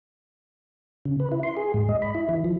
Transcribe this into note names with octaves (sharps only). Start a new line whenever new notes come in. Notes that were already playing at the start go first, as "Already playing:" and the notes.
C#3
B4
E4
C6
G#4
G#2
D#5
B5
E4
E3
F3